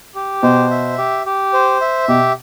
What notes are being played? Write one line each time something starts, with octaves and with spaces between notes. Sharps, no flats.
G4
B2 C5
E5
G4
G4
C5
E5
B2 G4